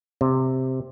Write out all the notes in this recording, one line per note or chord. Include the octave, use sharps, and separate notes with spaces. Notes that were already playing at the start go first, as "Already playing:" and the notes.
C3